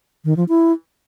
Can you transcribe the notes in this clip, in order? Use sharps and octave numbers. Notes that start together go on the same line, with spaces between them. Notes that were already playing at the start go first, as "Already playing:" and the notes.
D#3
F3
E4